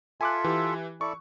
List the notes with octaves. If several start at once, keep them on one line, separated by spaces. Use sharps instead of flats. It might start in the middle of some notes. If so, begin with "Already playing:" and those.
F4 A4 E5 G#5 D6 F#6
E3 G4
E4 A4 D5 C#6